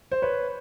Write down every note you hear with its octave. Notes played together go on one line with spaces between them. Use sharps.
C5
B4 C#5